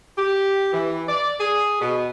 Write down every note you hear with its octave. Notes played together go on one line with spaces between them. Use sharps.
G4
E3
D5
G#4
B2